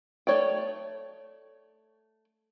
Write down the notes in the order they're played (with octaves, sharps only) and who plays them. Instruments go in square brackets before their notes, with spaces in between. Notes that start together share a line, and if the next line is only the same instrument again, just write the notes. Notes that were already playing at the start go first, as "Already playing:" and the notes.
[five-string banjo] A3 D#4 C#5 D5 G5